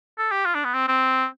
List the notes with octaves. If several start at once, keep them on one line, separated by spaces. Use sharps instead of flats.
A4
G4
F4
D4
B3
C4
C4